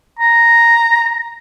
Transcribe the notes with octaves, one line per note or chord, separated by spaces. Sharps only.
A#5